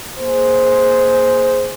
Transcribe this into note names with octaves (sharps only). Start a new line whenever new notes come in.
A#3 G#4 C5